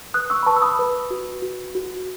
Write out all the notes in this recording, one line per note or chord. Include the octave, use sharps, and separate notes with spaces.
B4 D#6 F#6
C#6 E6
B5
B4 A5 C#6
E6
B5 D#6
B4
F#4
F#4
F#4